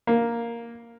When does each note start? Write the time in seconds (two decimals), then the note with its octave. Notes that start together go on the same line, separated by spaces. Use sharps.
0.07 A#3